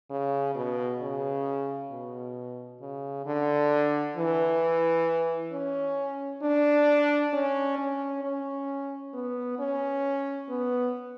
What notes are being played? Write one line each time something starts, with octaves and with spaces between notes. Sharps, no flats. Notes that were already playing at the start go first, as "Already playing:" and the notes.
C#3
B2
C#3
B2
C#3
D3
E3
C#4
D4
C#4
C#4
C#4
B3
C#4
B3